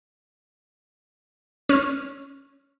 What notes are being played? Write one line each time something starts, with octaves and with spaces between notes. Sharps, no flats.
C#4 F6